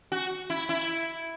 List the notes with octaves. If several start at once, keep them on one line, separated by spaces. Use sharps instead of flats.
F#4
E4
E4